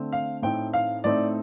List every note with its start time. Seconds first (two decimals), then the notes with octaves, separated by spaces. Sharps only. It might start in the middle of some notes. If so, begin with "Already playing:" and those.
Already playing: D3 A3 C4
0.13 F5
0.42 A2 A3 C4 D#4 G5
0.74 F5
1.04 A2 A3 C4 D#4 D5